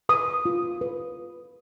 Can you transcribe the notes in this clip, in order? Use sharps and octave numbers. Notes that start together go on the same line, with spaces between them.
B4 D#6
F4
B4